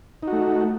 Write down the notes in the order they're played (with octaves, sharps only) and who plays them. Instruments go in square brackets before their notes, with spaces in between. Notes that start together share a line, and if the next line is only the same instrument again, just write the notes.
[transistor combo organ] D#4
F#4
A3